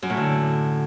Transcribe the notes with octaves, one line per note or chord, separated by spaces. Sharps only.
F#2
A2
D3